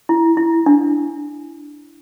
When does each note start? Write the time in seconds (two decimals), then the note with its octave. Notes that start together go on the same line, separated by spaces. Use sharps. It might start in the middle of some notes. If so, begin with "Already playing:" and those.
0.09 E4
0.37 E4
0.66 D4